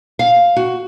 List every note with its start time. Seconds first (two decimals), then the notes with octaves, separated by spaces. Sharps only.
0.19 F5
0.56 F#4